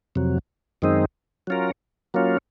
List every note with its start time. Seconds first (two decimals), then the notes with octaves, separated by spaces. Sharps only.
0.16 F2 C3 F#3
0.82 F#2 D#3 G#3 C4 D#4
1.47 F#3 C#4 F4 A#4
2.14 F#3 A#3 C#4 F4